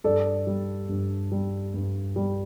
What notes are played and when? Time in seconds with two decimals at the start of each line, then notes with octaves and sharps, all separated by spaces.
0.04 G2 A4 D5
0.47 G3
0.89 G2
1.32 G3
1.74 G2
2.16 G3